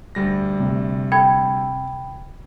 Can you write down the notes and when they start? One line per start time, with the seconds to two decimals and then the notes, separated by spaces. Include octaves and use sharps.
0.15 D2 G3 A#6
0.60 C3
1.12 G5 B5 G#6